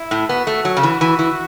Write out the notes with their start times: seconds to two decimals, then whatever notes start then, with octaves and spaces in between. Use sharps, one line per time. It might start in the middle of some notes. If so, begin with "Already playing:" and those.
Already playing: E4
0.11 A2
0.29 B3 F#4
0.47 A3
0.65 F#3
0.77 C#3
0.83 E3
1.01 E3
1.19 E3